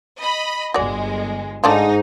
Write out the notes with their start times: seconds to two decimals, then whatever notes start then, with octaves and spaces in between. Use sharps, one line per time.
0.18 D#5 B5
0.74 G1 G#3 F#4 D5
1.64 G#2 A3 D4 D#4 F4